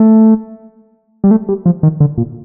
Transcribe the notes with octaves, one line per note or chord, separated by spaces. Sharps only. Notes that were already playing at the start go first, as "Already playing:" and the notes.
Already playing: A3
G3
A3
G3
F3
D#3
D3
A#2